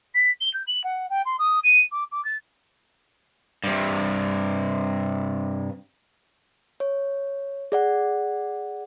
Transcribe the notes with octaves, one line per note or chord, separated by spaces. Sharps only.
B6
G7
G6
F#7
F#5
G5
C6
D#6
D#7
D6
D6
A6
G2 C3
C#5
G#4 D5 F#5